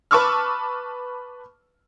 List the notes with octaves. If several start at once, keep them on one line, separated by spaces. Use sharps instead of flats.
B4 A5 C#6 D6 E6 F6